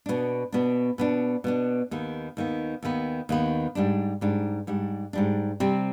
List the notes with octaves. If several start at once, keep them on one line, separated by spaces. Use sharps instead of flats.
B2 B3 D4
B2 B3 D4
B2 B3 D4
B2 B3 D4
D#2 D#3 B3
D#2 D#3 B3
D#2 D#3 B3
D#2 D#3 B3
G#2 G3 D4
G#2 G3 D4
G#2 G3 D4
G#2 G3 D4
C3 G3 C4